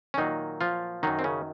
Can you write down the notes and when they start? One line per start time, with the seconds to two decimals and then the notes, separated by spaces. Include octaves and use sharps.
0.14 C#4
0.17 A#2 D#3 F#3 D#4
0.61 F3 F4
1.03 F#2 D#3 F#3 D#4
1.19 C4
1.24 C#3 C#4